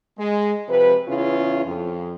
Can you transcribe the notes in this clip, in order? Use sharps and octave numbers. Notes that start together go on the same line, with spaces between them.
G#3
C3 F3 B4
E2 C#3 C#4 E4 F4
F2